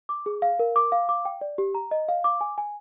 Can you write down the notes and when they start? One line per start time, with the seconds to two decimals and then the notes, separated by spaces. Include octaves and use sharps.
0.09 D6
0.26 G#4
0.42 F5
0.59 A#4
0.76 D6
0.92 F5
1.09 D6
1.25 G5
1.41 D5
1.58 G4
1.75 A#5
1.91 D#5
2.09 F5
2.24 D6
2.41 G#5
2.58 G#5